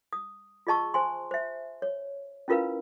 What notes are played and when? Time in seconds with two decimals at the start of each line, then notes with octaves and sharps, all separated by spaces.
0.13 D#6
0.67 F4 G#4 D#5 A5 C#6 E6
0.94 C5 G#5 C6
1.31 C5 E5
1.82 C#5
2.48 C#4 E4 F4 A#4 B4 F5